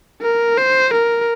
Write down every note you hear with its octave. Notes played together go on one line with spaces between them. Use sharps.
A#4
C5
A#4